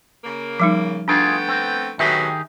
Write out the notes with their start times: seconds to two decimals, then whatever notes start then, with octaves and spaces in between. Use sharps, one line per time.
0.24 C#3 A#3
0.60 F3 G3 D#4
1.08 A3 B3 D4 F4 G#4 G5
1.49 C4
1.99 D#3 F#3 A3 B3 G4 G#4 E5